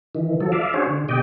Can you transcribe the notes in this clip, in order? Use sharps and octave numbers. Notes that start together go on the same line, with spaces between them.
D#3 E3
F3 F#3 A4
D5 E5 F5
C#4 D4 F#4 G#4 C5 C#5
D3
B2 G4 D5 D#5 G5